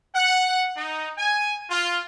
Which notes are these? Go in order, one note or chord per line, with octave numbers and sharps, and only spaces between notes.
F#5
D#4
G#5
F4